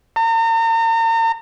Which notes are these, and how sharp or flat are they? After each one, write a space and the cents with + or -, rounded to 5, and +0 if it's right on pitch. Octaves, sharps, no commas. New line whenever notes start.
A#5 -40